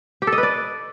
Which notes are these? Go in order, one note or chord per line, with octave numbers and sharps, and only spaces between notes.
G4
A4
D#5
B4
D5